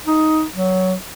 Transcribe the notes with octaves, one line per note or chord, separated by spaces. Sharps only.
D#4
F#3